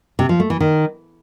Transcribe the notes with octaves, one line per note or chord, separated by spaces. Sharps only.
C3
F3
A3
E3
D#3